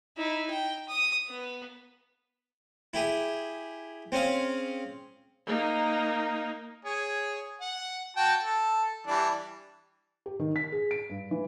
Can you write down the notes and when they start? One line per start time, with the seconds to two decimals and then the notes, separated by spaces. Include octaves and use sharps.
0.18 D#4 E4
0.51 G5
0.88 D#6
1.27 B3
2.94 E4 G4 G#4
4.12 C4 C#4 G#4 F5
5.46 A#3 D#4
6.85 G#4 C#5
7.61 F#5
8.17 F#4 G5 A5
8.42 A4
9.07 E3 G3 D4
10.26 G4
10.39 D#3
10.56 B6
10.72 G#4
10.91 D7
11.10 G2
11.31 E3